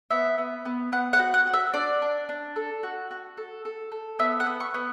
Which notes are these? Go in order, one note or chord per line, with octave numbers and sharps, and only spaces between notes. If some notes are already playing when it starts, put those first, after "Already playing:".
B3 E5
B3
B3
B3 F#5
F#5
F#4
F#5
F#4
E5
D4 D5
D4
D4
A4
F#4
F#4
A4
A4
A4
B3 E5
F#5
B3
C#6
B3